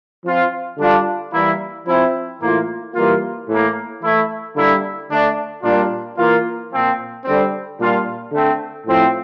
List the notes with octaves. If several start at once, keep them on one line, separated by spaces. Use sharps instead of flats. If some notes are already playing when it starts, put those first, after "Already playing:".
F3 C4 F4
D3 G3 D4 F4
E3 G3 A#3 E4
F3 C4 E4
A2 E3 A#3 F4
E3 G3 A#3 F4
A2 E3 A#3
E3 A3 E4
D3 G3 A#3 E4
D3 A3 D4
A#2 G3 A#3 D4 F4
E3 A#3 F4
A#2 F3 C4
D3 G3 C4
A#2 G3 D4 F4
D3 A3 C4
A2 F3 C4 E4